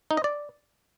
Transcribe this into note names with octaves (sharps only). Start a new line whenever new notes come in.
D#4
D#5
D5